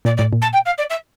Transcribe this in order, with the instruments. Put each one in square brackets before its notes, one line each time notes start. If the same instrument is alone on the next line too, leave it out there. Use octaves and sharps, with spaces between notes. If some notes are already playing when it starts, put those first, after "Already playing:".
[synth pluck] A#2 [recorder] D5
[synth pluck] A2 [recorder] D5
[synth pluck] A#2
[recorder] A5
G5
F5
D5
E5